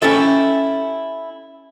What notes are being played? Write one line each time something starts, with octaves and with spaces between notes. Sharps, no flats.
C#4 E4 G4 A4 E5